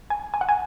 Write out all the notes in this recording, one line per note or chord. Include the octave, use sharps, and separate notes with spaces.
G#5
G#5
F#5
G#5